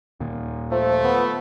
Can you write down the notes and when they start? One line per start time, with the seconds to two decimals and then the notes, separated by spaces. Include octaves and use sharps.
0.20 D#2 A#2
0.72 F3 A3
1.04 B3